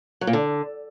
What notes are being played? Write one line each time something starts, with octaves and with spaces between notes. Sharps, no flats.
F#3
A#2
D3